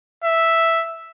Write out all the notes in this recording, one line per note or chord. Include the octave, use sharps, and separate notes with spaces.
E5